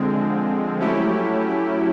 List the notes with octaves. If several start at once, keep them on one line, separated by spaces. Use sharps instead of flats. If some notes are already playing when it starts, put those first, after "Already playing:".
Already playing: D3 F3 G#3 C4
F#3 A3 C#4 E4 G4